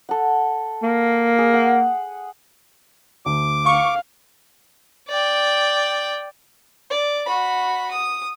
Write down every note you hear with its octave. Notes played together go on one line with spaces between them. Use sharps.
A4 F#5
A#3
G#4
F#5
D2 D6
F5 C#6
D5 G5
D5
F#4 B5
D#6